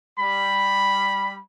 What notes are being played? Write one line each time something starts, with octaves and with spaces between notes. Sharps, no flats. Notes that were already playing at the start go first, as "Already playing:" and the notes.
G3 B5